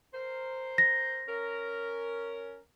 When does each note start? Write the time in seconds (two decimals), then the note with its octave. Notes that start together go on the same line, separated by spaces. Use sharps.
0.14 A#4 C5
0.78 A#6
1.28 C#4 A#4